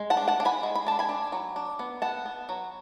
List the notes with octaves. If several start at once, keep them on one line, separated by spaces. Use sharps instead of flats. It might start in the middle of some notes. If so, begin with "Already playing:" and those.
Already playing: G#3
F#5 A5
D4
F#5 A5
D4
G#5 B5
G#3
B5
D4 A5
G#5 B5
D4
F#3
D4
B3
B3 F#5 A5
B3
F#3